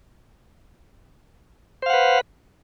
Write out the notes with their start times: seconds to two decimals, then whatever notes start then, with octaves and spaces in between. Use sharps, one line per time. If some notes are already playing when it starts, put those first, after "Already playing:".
1.82 C5
1.86 F5
1.90 F#5
1.94 B4